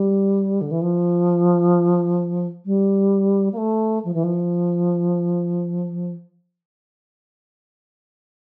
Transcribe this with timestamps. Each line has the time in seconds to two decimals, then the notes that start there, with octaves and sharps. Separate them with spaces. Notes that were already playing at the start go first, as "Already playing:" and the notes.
Already playing: G3
0.61 D3
0.71 E3
0.81 F3
2.65 G3
3.52 A#3
3.57 A3
4.04 F3
4.13 E3
4.23 F3